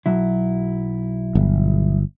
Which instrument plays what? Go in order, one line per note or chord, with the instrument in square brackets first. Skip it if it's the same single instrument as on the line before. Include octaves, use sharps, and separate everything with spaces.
[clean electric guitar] B1 F#3 E4
[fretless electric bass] G1